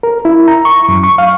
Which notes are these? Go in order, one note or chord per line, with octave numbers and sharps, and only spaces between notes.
A#4
E4
A#5
C#6
F#2
C#6
F5